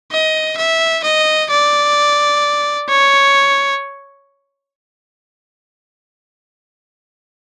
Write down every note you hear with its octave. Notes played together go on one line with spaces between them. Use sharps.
D#5
E5
D#5
D5
C#5